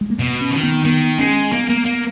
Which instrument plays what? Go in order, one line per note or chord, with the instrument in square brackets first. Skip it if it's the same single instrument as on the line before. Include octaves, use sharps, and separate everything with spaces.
[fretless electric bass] G#3
A#3
[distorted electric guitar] B2 [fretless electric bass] B3
[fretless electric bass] C#4
[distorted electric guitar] D#3
[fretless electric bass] B3
[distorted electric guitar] D#3 [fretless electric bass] B3
[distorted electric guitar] G#3 [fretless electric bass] C#4
[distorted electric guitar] A#3 [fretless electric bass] B3
[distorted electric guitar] A#3
A#3